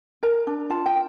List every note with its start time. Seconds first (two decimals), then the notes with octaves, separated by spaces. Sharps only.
0.23 A#4 A#5
0.47 D4
0.70 F4 A5
0.86 G5